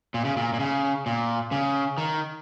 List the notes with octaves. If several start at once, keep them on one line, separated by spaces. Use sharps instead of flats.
A#2
C#3
A#2
A#2
C#3
A#2
C#3
D#3